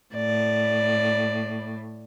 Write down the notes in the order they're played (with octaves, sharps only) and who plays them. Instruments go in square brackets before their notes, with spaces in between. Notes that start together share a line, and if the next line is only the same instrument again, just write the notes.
[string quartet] A2 [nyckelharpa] D5